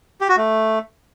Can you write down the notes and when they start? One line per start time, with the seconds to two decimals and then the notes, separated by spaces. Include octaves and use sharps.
0.21 G4
0.29 F#4
0.37 A3